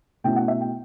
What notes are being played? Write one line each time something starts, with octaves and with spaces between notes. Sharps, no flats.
B2 A3 C#4 E4 G5
F#5
E5
G5